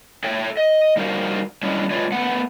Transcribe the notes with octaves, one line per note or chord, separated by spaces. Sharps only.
A4 C#5 E5 G5
D#5
G3 D#4 F#4 A#4 C5 F5
G3 G#3 C#4 D4 E4
G#3 D4 F4 B4 C#5 D5
A3 B3 F#5